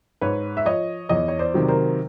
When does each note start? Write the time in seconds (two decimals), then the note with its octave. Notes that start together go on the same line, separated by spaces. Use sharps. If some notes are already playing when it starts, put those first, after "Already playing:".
0.21 G#2 B4 C#5
0.57 E5
0.65 F3 C#5 D#5
1.09 E2 C#5 D#5
1.28 C#5
1.39 C5 D5
1.54 C3 D#3 F#3
1.68 A#4 C5